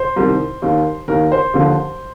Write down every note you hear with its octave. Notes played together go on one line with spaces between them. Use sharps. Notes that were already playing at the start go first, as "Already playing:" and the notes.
Already playing: C5
C2 C3 D#3
D#2 D#3
D#2 D#3 A#4
C5
D#2 D3 F3